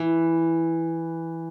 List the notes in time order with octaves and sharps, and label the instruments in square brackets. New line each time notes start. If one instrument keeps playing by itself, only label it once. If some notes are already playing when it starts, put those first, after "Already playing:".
Already playing: [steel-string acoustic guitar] E3